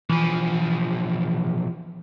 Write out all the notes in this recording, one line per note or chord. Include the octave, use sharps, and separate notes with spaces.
B1 E3 F3